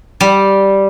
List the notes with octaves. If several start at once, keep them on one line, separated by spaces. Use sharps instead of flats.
G3